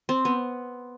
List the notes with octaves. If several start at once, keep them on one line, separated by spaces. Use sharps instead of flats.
C4
B3